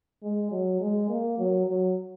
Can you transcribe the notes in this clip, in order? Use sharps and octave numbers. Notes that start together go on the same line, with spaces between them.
G#3
F#3
G#3
A#3
F#3
F#3